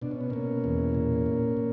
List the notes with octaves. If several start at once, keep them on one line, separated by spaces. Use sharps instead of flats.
B2 D4
C#4
B3
B2 A#3 C#4
E2
A#2
A#2
A#2